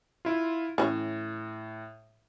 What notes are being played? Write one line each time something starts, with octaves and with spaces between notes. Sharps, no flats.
E4 F4
A2 E3 C#4